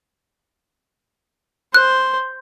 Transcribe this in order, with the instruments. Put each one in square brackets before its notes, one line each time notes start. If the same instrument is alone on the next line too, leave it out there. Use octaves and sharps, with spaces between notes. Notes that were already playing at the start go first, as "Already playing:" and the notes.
[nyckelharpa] C5 [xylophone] F#6